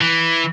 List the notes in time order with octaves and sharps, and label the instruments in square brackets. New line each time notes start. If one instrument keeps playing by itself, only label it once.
[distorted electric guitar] E3